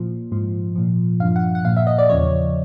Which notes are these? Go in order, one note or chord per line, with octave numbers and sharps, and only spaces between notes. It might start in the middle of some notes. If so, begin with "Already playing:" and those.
Already playing: A#2 F3
G#2 F3
A#2 F3
G2 D3 F3 F5
F#5
F#5
A#2 F3 F5
E5
D#5
D5
E2 C#3 F3 C#5